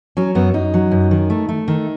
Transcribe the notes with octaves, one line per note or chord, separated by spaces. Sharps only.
F#3 C#4
F#2 B3
F#2 D#4
F#3
F#2
D#3
A3
A3
D#3